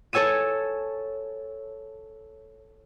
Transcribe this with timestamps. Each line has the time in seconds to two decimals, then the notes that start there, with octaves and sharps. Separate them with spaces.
0.13 A4 C#5 G#5 E6 D#7